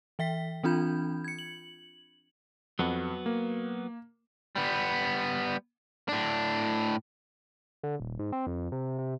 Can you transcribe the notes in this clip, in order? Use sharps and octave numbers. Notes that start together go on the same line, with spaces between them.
E3 E5 G5 B6
E3 C4 D4 F4 B5 G6
G#6 C#7
F#7
F2 F#3 B3 F#4
A#3
G3 B3
A2 D4
D3
D#1
G#2
C4
F2
C3
C3